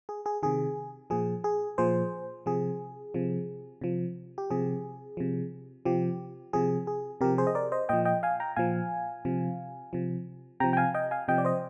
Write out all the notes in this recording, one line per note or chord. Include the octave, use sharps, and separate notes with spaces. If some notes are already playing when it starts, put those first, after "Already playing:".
G#4
G#4
C3 D#3 G#4
A#2 F3 G#4
G#4
A#2 F3 G#4 C5
C3 F3 G#4
C3 F3
C3 F3
G4
C3 F3 G#4
C3 F3
C3 F3 G4
C3 F3 G#4
G#4
C3 F3 G4 A#4
G#4 C5
D#5
A#4 D5
C5 D#5
A#2 F3 D#5 G5
D#5 G5
F5 G#5
G5 A#5
A#2 F3 F5 G#5
C3 F3
C3 F3
C3 F3 G5 A#5
G5
F5 G#5
D#5 G5
F5 G#5
C3 F3 D#5 G5
D5
C5 D#5